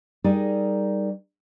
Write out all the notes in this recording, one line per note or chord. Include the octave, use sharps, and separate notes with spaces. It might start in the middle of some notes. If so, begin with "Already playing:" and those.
G3 D#4 G#4 A#4 D5